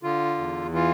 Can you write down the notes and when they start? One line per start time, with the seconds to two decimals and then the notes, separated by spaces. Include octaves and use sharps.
0.03 D3 F4
0.38 E2
0.73 E3 F4